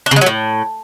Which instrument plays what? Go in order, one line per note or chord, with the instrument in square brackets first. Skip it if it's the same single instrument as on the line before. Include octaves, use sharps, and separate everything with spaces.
[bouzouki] D4
C#3
G#3
F#3
A2